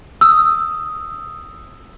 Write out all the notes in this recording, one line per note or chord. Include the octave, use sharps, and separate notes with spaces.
D#6 E6